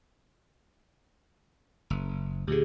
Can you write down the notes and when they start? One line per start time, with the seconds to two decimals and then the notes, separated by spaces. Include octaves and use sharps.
1.90 F#1
2.47 D2 A#2 D3 G4 G#4